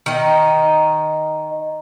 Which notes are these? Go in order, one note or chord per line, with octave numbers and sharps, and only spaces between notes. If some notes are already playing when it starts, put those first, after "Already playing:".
D#3 D#5